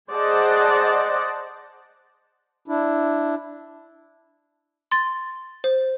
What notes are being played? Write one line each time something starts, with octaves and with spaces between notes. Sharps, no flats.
G#4 C5 D5 D#5 F#5 A5
D4 E4
C6 A6
C5